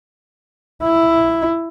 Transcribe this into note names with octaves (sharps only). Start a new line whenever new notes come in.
E4